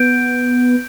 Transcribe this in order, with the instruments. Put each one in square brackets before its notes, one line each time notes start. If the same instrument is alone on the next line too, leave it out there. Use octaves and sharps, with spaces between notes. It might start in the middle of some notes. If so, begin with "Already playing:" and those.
Already playing: [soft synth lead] B3 [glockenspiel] G6 D7